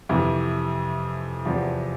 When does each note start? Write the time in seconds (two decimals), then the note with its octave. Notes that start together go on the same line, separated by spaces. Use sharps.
0.09 F2 C3 E3
1.45 E2 C3 F3